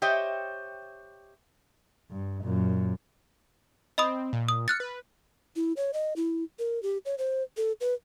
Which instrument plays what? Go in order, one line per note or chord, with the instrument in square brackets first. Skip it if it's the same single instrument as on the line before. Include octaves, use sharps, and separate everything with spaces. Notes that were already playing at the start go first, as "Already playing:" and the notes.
[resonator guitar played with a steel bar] G4 C5 C#5 D#5 E5 G5
[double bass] G2
F#2 A#2
[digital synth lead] C4 [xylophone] D#5 B5 D#6
[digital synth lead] A#2
[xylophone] D#6
[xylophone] F6 F#6 A6 [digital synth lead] C#7
[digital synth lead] B4
[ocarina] E4
C#5
D#5
E4
A#4
G4
C#5
C5
A4
B4